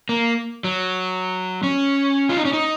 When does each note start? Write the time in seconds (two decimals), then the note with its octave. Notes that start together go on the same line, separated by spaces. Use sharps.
0.09 A#3
0.64 F#3
1.63 C#4
2.29 F4
2.37 D#4
2.45 C#4
2.53 D#4